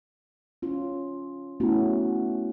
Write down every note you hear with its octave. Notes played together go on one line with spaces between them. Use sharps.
C#4 F4
A3 B3 C#4 E4 F#4